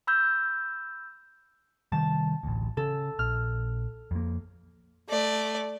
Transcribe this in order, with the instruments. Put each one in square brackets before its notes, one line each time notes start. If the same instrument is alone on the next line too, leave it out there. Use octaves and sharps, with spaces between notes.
[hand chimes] B5 E6 G6
[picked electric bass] C3 D#3 G3 [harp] A5
[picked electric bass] A1 D2
[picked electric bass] C#3 [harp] A4
[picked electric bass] A#1 [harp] F6
[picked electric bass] F2 A#3
[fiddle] A3 D5